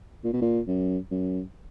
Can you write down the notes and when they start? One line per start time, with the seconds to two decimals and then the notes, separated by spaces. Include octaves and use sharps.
0.24 A#2
0.33 B2
0.42 A#2
0.68 F#2
1.11 F#2